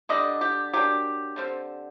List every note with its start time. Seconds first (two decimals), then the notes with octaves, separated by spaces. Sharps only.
0.09 D3 G3 D4 D#5
0.41 G4
0.73 F#3 A#3 D4 G4
1.36 D3 G3 C4